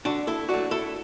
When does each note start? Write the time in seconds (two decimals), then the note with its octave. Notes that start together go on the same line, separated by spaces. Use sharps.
0.05 D3 D4 F#4
0.27 E4 A4
0.49 F#3 A3 D4 F#4
0.71 E4 A4